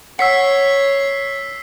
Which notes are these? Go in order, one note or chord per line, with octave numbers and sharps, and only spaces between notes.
C#5 F#5 E6 B6 C7